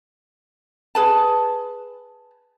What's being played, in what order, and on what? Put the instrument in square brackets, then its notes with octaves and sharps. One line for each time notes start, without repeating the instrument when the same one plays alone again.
[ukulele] G#4 B4 A5